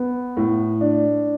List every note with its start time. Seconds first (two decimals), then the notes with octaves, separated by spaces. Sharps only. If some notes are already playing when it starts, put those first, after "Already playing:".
Already playing: B3
0.37 A2
0.81 D4